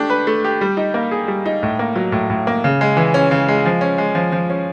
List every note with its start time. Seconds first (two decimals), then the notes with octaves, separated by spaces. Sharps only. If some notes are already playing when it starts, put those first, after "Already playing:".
Already playing: A3 D4 G4
0.10 B4
0.27 A3
0.44 G4
0.61 G3
0.77 D#4
0.94 A#3
1.11 G#4
1.28 G3
1.46 D#4
1.63 A2
1.79 A#3
1.96 F#3
2.12 A2
2.30 A2
2.47 A#3
2.64 C#3
2.81 G#3
2.97 E3
3.14 C#4
3.31 C#3
3.49 G#3
3.65 F3
3.81 C#4
3.98 G#3
4.15 F3
4.32 F3
4.50 C#4